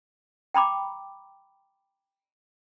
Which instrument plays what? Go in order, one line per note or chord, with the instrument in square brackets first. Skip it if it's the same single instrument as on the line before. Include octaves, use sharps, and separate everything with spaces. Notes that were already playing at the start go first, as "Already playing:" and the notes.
[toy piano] G5 A#5 B5 D6